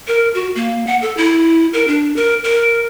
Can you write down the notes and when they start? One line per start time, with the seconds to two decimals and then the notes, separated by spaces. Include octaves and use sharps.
0.07 A#4
0.35 F#4
0.55 A#3
0.87 F#5
1.02 A4
1.17 E4
1.73 A#4
1.88 D4
2.16 A#4
2.44 A#4